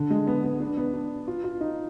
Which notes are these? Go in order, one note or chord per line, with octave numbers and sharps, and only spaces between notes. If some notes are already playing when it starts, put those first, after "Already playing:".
Already playing: D3
G#3
B3
B3
D4
B3
D4
F4
F4
D#4